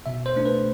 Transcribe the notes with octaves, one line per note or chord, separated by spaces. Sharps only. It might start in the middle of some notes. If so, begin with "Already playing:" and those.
B2 E5
C5
A3 D4
B4